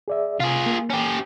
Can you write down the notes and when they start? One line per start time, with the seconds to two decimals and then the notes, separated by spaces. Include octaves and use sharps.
0.08 G#4 D5 E5
0.40 C3 F4 G#4
0.66 A#3
0.90 C#4 G4